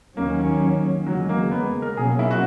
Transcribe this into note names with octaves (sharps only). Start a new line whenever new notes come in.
D#2 D#3 F#3 A#3 C#4
E2 C#3 F#3 G#3
A#3
B3
A#4
B2 F#3 A#3 C#4 G#4
E4
F#4